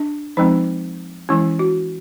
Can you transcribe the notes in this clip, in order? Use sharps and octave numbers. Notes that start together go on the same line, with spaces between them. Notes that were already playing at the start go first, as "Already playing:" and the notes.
Already playing: D4
F3 G#3 C4 D#4
E3 G#3 C#4 E4
F#4